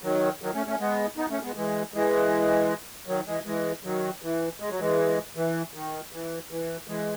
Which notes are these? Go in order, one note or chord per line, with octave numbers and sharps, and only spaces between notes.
D#3 F#3
D#3 F#3
A3 C#4
A3 C#4
G#3 B3
B3 D#4
A3 C#4
G#3 B3
E3 G#3
E3 G#3
D#3 F#3
E3 G#3
E3 G#3
D#3 F#3
E3
G#3
F#3
E3 G#3
E3
D#3
E3
E3
E3 G#3